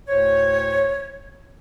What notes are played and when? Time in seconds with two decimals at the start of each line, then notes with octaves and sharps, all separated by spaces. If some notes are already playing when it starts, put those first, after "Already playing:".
0.08 D2 A2 C5 C#5